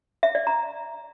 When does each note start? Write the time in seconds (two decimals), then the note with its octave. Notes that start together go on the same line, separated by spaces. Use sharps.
0.23 E5
0.35 D5
0.47 A#5